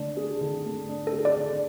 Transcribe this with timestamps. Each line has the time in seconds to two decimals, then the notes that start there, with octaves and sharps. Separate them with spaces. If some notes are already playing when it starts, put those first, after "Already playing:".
Already playing: D3 A3 D4
0.17 G#4
0.41 D3
0.65 A3
0.89 D4
1.07 A4
1.13 G#4
1.25 D5
1.36 D3